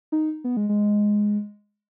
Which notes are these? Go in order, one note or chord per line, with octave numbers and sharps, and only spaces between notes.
D#4
B3
G#3
G#3